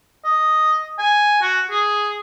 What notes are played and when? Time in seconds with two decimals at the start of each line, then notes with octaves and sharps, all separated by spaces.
0.25 D#5
0.99 G#5
1.42 F#4
1.70 G#4